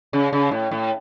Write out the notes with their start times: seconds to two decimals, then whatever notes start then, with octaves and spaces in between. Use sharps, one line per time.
0.13 C#3
0.33 C#3
0.51 A2
0.71 A2